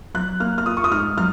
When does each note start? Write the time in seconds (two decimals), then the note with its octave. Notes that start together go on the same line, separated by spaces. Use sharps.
0.14 F#3 F#6
0.40 A#3 F6
0.58 F6
0.66 F4 D#6
0.77 C#6
0.84 D#6
0.92 G#2 F6
1.18 F#3 F6